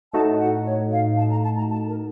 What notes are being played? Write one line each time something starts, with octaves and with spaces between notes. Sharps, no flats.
A2 A3 D#4 F#4 A5
F#5
C#5
F5
A5
A#5
A5
A#5
A5
A#4